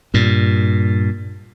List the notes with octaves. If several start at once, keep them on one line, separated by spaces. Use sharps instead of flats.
G2 A#2